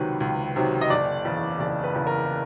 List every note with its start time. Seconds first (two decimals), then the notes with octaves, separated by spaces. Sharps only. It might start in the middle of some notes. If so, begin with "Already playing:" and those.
Already playing: C#2 C3 D#3 F#3 B4
0.20 C#2
0.56 C3 D#3 F#3
0.81 D#5
0.90 F#1 D5
1.25 E2 C#3
1.60 F#1 D5
1.84 B4
1.95 E2 C#3
2.07 A#4